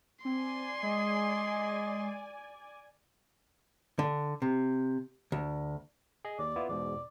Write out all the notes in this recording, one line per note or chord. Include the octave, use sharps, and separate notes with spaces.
C4 D5 G#5 C6
G#3 D#5
D3
C3
D2
G#4 D#5
D#2 D5
B3 E4 F4
E2 G#2 B2 D5